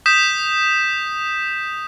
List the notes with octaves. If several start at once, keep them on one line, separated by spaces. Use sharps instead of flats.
D#6 G6 B6 E7